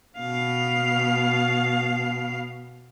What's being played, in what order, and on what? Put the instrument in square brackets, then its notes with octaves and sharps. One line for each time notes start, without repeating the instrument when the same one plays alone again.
[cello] B2 F5